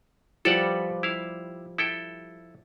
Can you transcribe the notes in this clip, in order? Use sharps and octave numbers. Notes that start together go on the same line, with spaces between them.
F3 G3 A4 B4 D5 F#5
E4 F5
E4 A4 G5